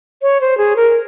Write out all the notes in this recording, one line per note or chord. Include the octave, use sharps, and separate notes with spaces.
C#5
C5
G#4
A#4